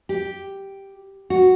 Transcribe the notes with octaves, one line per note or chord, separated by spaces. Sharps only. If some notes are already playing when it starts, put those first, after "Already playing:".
G4
F#4